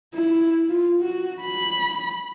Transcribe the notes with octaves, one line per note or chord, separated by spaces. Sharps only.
E4
F4
F#4
B5